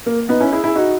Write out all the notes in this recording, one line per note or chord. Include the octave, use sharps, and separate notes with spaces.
A#3
B3 D#4
C#4 E4
E4 G#4
E4 G#4
D#4 F#4